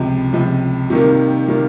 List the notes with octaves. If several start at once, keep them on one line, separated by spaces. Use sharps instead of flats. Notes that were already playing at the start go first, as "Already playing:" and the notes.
Already playing: C#2 C3 F3
C#2 C3 F3
C3 D#3 G3 A#3
C3 D#3 G3 A#3